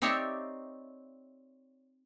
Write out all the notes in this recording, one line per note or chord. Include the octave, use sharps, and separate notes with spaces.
C4 D#4 G4 C#5 D5 E5